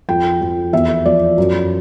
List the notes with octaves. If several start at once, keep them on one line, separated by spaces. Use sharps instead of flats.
F2 G5
F2
E2 E5
F3 D5
F#2